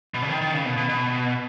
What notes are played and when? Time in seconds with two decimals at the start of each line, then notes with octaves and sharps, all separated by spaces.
0.14 B2
0.22 C#3
0.29 D#3
0.41 D#3
0.54 C#3
0.65 B2
0.77 B2
0.89 B2